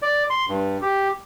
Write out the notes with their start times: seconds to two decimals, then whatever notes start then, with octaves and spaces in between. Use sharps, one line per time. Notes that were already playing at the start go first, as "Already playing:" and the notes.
0.02 D5
0.30 C6
0.49 G2
0.82 G4